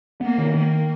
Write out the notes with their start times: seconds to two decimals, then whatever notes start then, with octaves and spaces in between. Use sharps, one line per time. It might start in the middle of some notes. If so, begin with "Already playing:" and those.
0.21 A#3 B3
0.38 D#3
0.55 D#3 A#3